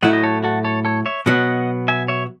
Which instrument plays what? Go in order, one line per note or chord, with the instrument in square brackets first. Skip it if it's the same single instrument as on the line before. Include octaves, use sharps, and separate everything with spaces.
[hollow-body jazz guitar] A2 F#3 A3 E4 [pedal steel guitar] D#5 F#5
[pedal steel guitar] D#5
A4 C#5
F#4 A4
A4 C#5
A4 C#5
C#5 E5
[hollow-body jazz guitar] B2 F#3 B3 [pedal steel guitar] D#5 F#5
[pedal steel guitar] E5 G#5
C#5 E5